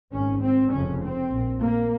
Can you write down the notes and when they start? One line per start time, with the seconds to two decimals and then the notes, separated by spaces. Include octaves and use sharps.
0.12 G#1 G#2 C#4
0.41 C4
0.71 F1 F2 C#3 C#4
1.01 C4
1.30 A#1 A#2
1.61 A#3